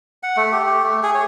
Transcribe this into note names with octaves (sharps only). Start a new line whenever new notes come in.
F#5
A3
G4
G4
A3
G#4
C#5